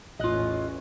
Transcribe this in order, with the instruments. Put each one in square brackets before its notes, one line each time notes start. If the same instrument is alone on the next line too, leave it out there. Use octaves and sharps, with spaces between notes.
[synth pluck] A#1 F#6 [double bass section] E2 A2 C#4 [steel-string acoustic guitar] F4 D#5